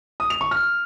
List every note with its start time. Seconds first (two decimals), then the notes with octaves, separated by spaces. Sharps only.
0.20 D#6
0.30 F7
0.41 C#6
0.51 F6